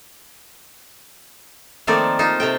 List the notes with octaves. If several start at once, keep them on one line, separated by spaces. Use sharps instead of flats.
D#3 F3 A3 A#3 C4 D5
D#4 F4 C5
C3 A3 G5